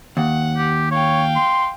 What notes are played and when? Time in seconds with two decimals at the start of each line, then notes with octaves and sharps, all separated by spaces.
0.17 D#2 F#5
0.57 G4
0.91 C#5 F5 G5
1.36 C6